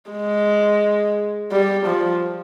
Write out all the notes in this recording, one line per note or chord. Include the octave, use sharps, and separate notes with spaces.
G#3
G3
F3